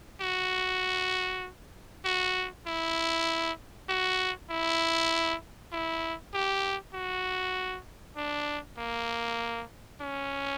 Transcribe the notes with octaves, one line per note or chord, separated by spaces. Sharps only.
F#4
F#4
E4
F#4
E4
E4
G4
F#4
D4
A#3
C#4